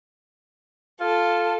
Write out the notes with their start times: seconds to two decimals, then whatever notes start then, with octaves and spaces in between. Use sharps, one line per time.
1.00 F4 A4